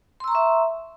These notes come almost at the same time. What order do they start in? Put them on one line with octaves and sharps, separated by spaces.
C6 E6 A#5 C#6 E5